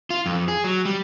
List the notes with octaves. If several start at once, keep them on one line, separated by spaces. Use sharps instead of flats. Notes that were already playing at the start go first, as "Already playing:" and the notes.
F4
F2
G#4
F#3
G3